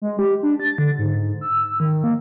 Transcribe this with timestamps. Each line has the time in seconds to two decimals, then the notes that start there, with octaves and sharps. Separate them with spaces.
0.02 G#3
0.19 G4
0.43 D4
0.60 A6
0.78 D3
0.98 G#2
1.41 E6
1.80 D#3
2.04 A#3